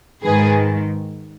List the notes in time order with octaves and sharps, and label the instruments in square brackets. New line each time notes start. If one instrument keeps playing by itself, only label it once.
[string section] G#2 D#3 G#4 B4